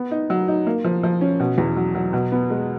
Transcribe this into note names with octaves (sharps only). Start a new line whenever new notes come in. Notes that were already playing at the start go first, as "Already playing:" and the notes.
Already playing: B3
D#4
F#3
D#4
A#3
F3
F3
C#4
B2
E2
F#3
F#3
B2
B3
G#3